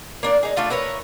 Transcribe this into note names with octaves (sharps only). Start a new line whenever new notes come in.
A#3 D4 D5
D#4 G#4
A3 D4 F4 A4
E4 A#4 B4 C#5